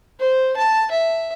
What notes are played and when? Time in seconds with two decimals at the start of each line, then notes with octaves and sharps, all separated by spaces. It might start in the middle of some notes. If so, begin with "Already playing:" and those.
0.19 C5
0.56 A5
0.91 E5